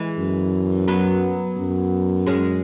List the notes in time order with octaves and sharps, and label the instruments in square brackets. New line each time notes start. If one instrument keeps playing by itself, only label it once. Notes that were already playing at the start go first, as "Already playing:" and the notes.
Already playing: [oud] E3 G#3
[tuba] F#2
[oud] F#3 B3
[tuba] F#2
[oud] G#3 C#4